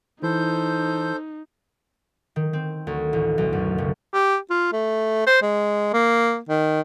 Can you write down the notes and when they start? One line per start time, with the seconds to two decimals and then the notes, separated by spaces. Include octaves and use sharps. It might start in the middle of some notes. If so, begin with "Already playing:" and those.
0.23 E3 D#4 A4 C5 G6
2.36 D#3
2.53 C4
2.87 D2
3.13 A1
3.38 B1
3.52 F#2
3.78 F#1
4.13 G4
4.50 F4
4.73 A3
5.27 C5
5.42 G#3
5.93 A#3
6.49 D#3